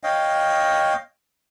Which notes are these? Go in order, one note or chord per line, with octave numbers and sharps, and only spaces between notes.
C#5 D#5 F5 G5